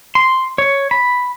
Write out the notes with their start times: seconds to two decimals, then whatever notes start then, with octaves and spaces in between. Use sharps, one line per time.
0.15 C6
0.58 C#5
0.91 B5